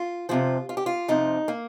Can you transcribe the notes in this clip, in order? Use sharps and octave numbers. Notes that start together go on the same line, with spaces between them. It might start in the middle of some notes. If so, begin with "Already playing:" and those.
Already playing: F4
F2 C3 F3 F4
F4
G4
F4
F2 C3 F3 D#4
A#3